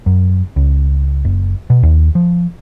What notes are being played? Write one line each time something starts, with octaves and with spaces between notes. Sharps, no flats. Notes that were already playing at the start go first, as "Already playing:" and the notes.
F#2
C#2
F#1
B2
D#2
F3